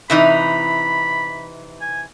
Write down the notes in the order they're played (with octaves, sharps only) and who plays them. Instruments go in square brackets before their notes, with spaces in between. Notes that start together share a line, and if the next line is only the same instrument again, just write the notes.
[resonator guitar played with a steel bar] C3 E3 D#4 [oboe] B5
[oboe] G#5